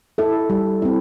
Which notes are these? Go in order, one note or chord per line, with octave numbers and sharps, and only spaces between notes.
E4 A4 E5
G3
C4 E4